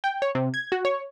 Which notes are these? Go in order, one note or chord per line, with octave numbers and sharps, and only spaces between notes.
G5
C#5
C3
G#6
F#4
C#5